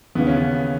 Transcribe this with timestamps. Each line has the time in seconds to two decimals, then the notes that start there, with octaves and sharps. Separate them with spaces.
0.15 D#2 C#3 E3 B3
0.27 C#4
0.37 B3